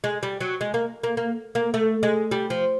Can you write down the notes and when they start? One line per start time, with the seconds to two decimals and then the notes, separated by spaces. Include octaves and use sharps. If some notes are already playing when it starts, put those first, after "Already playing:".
0.04 G#3
0.23 G3
0.41 F#3
0.61 G#3
0.74 A#3
1.03 A#3
1.17 A#3
1.55 A#3
1.74 A3
2.03 G#3
2.31 G3
2.50 F3